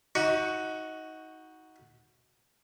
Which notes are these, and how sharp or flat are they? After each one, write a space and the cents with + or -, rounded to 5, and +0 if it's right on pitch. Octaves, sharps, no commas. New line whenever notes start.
D#4 +25 F#4 +0 C#6 +15